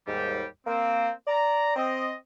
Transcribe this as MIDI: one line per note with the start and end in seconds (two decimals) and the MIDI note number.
0.07 0.44 39
0.07 0.44 44
0.07 0.44 55
0.07 0.44 67
0.66 1.10 58
0.66 1.10 60
1.27 1.75 74
1.27 1.75 82
1.76 2.12 60
1.76 2.12 75